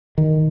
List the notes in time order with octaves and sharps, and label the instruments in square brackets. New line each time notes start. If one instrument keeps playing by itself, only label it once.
[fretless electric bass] D#3